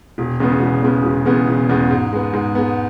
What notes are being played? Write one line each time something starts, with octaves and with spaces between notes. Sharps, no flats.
E1
E2 C#3 G#3 B3
E1
E2 C#3 G#3 B3
E1
E2 C#3 G#3 B3
E1
E2 C#3 G#3 B3
G#2
G#3 B3
G#2
G#3 B3